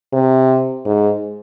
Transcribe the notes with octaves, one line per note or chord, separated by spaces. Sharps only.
C3
G#2